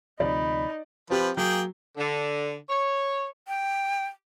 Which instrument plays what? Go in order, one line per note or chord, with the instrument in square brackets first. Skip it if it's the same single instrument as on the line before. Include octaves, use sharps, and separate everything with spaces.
[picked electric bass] D2 C3 F3 [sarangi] D#4 [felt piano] D5 [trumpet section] B5
[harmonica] F3 B4 [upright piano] C4 G4
[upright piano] F#3 [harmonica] A#3 G#4 G5
[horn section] D3
C#5
[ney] G5